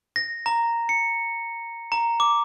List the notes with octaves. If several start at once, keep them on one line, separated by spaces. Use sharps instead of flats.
A#6
A#5
C#7
A#5
D6